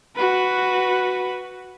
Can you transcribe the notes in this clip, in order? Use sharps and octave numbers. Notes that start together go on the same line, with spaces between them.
F#4 B4